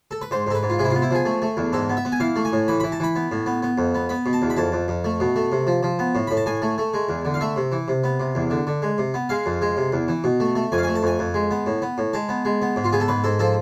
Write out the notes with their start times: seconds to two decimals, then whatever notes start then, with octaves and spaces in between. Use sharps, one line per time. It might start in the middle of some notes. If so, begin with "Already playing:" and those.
0.11 A4
0.22 B4
0.31 G#2 C5
0.47 G#2 A4
0.55 B4
0.63 G#2
0.70 F4
0.79 C3 G#4
0.84 E4
0.90 B3 F4
1.02 E4
1.11 F3 G#4
1.26 A3
1.42 A3
1.57 E2
1.73 G#2 A4
1.89 B3
1.97 E5
2.05 B3
2.12 G#5
2.20 E3 F5
2.36 A3
2.45 G#5
2.53 A2
2.68 E3 B5
2.80 E3 B5
2.92 A5
3.00 E3 B5
3.16 B3
3.32 A2
3.46 B3
3.63 B3
3.78 F2
3.95 B3
4.09 B3 B5
4.26 B2
4.33 A5
4.42 E2
4.50 B5
4.57 F2 A5
4.72 F2
4.88 F2
5.04 A3
5.20 B2
5.36 A3
5.52 C3
5.67 F3
5.83 F3
5.99 B3
6.15 A2
6.27 A2 B5
6.37 A5
6.46 A2 G#5
6.62 A3
6.78 A3
6.94 G#3
7.09 E2
7.25 D3
7.34 F5
7.41 A3 E5
7.56 C3
7.72 E3
7.88 C3
8.04 B3
8.20 C3
8.35 E2
8.51 D3
8.67 D3
8.82 G#3
8.98 C3
9.14 B3
9.29 G#3 F5
9.46 F2
9.62 G#3
9.77 C3
9.93 E2
10.08 E3
10.24 B2
10.40 A3
10.55 A3
10.72 F2 G#5
10.78 F5
10.83 A3 G#5
10.95 A5
11.03 F2 G#5
11.19 F2
11.34 G#3
11.51 B3
11.67 A2
11.82 B3
11.98 A2
12.13 G#3 A5
12.29 B3
12.45 G#3
12.62 B3
12.76 G#2
12.84 F4
12.93 B3 G#4
13.00 A4
13.08 G#2 B4
13.24 G#2 A4
13.39 F3 A4